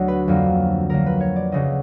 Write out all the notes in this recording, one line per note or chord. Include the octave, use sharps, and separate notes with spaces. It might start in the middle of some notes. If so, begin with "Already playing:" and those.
Already playing: D2 D3 F#3 F#4
B4
F2 D3 F#3 A#3
F2 D3 F#3 A#3 A#4
B4
C#5
D5
D2 C#3 F#3 D#5